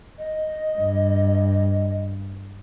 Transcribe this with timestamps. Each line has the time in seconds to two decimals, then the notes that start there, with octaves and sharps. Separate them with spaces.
0.18 D#5
0.77 G2